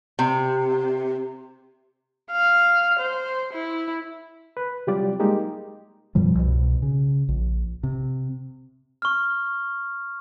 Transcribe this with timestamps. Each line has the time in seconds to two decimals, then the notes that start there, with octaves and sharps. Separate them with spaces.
0.19 C3
2.31 F5
2.99 C5
3.53 E4
4.57 B4
4.87 C3 F#3 G3 F4 G4 D5
5.19 G3 G#3 A#3 D#4 G4
6.15 F#2 B2 F3 G3
6.35 C2 B2
6.82 C#3
7.28 A#1
7.83 C3
9.02 C#6 F6